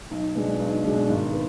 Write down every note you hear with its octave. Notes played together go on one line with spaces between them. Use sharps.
B1
B2 G#3 D4
B1
B2 G#3 D4
G#1
B3